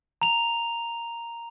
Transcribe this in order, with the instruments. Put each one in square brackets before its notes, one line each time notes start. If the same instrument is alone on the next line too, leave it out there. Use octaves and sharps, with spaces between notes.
[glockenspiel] A#5 F7